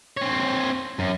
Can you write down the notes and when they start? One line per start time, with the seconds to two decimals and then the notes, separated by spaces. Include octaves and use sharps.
0.17 C4 C#5
0.99 F#2